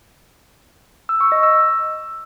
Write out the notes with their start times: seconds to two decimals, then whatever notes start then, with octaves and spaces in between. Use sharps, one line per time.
1.09 E6
1.20 C#6
1.32 D#5
1.43 E6